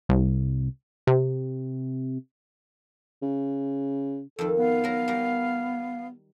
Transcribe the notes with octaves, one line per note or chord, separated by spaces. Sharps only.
C2
C3
C#3
F2 D#3 A4
B3 F5
F#3 A#4
G3 A#4